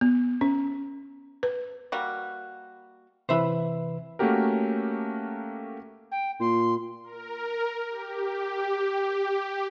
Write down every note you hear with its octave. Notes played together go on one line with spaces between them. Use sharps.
B3
C#4
B4
G3 A#3 F#4
C3 E3 B4 C5 E5 B5
A3 A#3 C#4 F#4 G4 A#4
G5
A#2 C6
A#4
G4